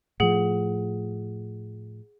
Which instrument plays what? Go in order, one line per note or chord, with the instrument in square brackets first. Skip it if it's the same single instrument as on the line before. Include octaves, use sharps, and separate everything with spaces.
[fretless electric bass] A2 F3 [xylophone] G#4 F#5